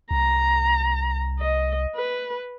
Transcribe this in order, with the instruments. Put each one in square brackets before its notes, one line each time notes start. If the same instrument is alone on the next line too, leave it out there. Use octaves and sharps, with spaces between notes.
[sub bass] C2 [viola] A#5
[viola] D#5
B4